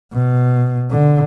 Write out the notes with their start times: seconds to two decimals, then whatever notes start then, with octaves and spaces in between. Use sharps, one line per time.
0.13 B2
0.90 D3